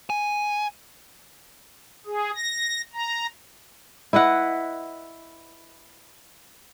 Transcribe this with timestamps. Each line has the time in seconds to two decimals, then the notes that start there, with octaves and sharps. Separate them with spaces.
0.10 G#5
2.06 G#4
2.35 A#6
2.94 A#5
4.13 E4 B4 D#5 F#5